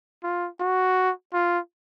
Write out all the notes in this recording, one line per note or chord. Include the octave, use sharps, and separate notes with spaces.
F4
F#4
F4